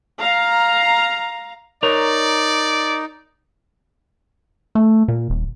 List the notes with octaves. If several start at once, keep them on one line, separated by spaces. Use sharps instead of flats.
F5 A#5
D#4 A#4 C#5 D5
A3
A#2
D#1